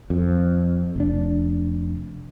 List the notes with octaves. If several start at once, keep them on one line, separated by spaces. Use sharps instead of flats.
F2
F1 D4